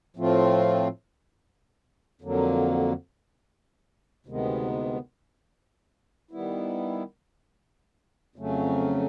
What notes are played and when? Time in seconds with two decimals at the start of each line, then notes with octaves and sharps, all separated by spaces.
0.17 A2 F3 A3 C4 F4
2.22 F2 D3 F#3 A#3
4.26 D2 C3 D#3 G#3 B3
6.31 D#3 G3 B3 E4
8.36 F2 C#3 F#3 A3 C#4